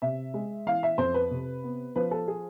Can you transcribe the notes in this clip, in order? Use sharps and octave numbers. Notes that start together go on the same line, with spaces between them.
C3 E5
G#3
E3 F5
E5
F2 C5
B4
C3
B3
F3 B4
A4
G#4